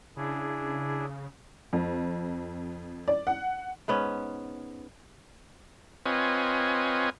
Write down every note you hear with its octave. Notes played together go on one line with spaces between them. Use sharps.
C#3 D4 E4 G#4
F2
D5
F#5
G#2 B3 C#4
C4 F4 B4 C#5 D#5 G#5